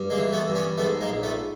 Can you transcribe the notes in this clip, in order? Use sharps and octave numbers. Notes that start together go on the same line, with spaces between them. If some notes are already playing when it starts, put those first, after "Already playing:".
Already playing: G2
G#3 A#3
E3
A3 B3
G2
B3 C#4
G#2 A3 B3
G#3 A#3
A#1
A3 B3